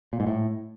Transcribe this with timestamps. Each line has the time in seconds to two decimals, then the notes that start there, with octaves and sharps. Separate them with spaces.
0.13 A#2
0.20 G#2
0.27 A2